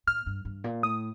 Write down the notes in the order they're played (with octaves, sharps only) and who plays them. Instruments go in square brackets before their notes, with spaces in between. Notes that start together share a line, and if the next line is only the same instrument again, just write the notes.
[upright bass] A2 [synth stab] F6
[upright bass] G2
G2
A#2
[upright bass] A2 [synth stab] D#6